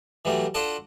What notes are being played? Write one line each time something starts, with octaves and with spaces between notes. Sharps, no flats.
E3 F#3 G3 A3
D4 F4 F#4 A4 F#5 A5